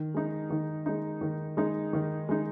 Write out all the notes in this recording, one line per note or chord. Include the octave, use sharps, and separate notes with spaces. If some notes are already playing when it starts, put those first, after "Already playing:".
Already playing: D#3
G#3 D#4
D#3
G#3 D#4
D#3
G#3 D#4
D#3
G#3 D#4